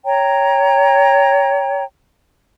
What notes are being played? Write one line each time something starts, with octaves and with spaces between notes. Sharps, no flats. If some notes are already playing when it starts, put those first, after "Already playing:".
C#5 G5 A#5